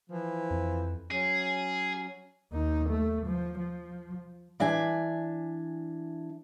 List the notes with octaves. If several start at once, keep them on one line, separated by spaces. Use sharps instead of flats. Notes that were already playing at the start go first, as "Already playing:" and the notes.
E3 F3
F2
F#3 C#4 G#4
D#2 D#4
A3
F3
F3
E3 D4 E5 G#5